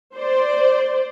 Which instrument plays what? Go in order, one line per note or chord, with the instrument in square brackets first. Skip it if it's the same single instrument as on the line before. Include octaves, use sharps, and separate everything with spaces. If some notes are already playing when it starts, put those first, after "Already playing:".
[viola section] C5 D5